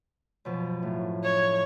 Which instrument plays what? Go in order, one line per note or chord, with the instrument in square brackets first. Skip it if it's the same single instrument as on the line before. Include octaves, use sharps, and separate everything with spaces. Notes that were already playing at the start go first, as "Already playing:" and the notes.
[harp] F#2 B2 F3
A2
[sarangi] C#5